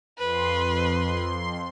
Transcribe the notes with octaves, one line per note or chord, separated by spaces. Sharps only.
F2 B4 C6